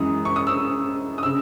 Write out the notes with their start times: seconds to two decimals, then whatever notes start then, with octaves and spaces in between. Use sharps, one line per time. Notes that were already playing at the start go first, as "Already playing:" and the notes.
Already playing: F#2 E3 G#3 D#6
0.25 C#6
0.36 D#6
0.47 E6
1.18 D#6
1.23 C#3 E6